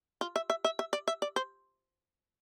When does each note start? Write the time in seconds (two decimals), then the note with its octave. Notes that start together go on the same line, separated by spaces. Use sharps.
0.21 F4
0.36 E5
0.50 E5
0.64 E5
0.79 E5
0.93 D5
1.08 E5
1.22 D5
1.36 C5